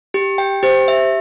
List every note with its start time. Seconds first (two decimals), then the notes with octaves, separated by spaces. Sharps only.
0.14 G4
0.38 G5
0.63 G4 C5
0.88 E5